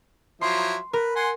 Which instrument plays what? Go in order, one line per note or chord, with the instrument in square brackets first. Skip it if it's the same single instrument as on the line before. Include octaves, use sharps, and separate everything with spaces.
[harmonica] F3 F#3 E4 [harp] C6
[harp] A#4 [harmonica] B4
[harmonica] F#5 G#5 C6